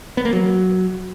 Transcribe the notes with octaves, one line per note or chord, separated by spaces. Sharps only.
B3
A#3
F#3